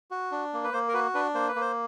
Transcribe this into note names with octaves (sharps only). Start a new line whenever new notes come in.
F#4
D4
A#3
B4
A#3 C5
A#4
F#4 B4
D4 B4
A#3 C5
B4
A#3
C5